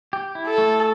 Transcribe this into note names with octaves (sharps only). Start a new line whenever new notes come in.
G4
E4
A4
A3